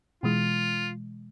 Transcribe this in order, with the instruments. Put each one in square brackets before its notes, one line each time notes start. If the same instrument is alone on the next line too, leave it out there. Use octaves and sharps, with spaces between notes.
[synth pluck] B2 E3 G#3 [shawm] F4